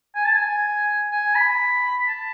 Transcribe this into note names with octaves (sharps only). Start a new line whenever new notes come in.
G#5
A5
G#5
G#5
B5
A5